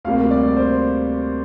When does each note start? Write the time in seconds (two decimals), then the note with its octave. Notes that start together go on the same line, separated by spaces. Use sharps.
0.04 D2 C3 G3 A#3 F5
0.31 D5
0.57 C5